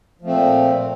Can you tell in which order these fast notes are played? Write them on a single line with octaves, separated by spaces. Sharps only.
F3 A3 C4 A#2